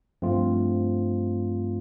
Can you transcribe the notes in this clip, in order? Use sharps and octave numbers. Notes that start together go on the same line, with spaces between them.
G2 F3 A3 C4 F4